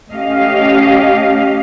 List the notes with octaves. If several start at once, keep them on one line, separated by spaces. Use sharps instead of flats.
A3 C#4 G4 D#5 F5